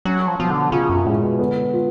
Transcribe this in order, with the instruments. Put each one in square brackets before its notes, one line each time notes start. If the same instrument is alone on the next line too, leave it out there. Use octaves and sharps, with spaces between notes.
[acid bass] F#3 [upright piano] C#4
[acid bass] F3
[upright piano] B2 [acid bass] F3
[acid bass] D3
[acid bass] C#3 [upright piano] F4
[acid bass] F#2
[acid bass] A2 [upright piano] G#3
[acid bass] B2
[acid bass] D3 [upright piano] B3
[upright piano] F4